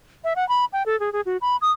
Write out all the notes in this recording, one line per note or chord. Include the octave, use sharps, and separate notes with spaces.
E5
F#5
B5
G5
A4
G#4
G#4
F#4
B5
D#6